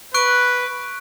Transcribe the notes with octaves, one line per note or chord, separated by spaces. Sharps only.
B4 C#6 F#6 D7